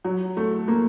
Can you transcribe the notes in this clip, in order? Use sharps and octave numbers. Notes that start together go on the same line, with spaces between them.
F#3
A3
A#3